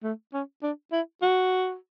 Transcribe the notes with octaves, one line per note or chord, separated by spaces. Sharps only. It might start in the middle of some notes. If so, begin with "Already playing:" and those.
A3
C#4
D4
E4
F#4